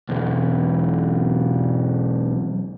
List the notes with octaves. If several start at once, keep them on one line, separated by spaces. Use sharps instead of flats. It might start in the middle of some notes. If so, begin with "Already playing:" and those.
B1 E2